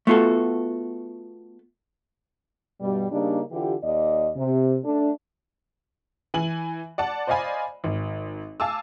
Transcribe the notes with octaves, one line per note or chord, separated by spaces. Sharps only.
A3 B3 F4 F#4 A4
G2 B2 G3
C#3 G3 A#3 D4 D#4
D3 E3 F4 G4
D#2 D5 D#5
C3
A3 D4
E3 G#5 F#7
D5 F#5 A5
C5 D5 D#5 F5 G#5 B5
G#1
F5 G#5 A5 D6 E6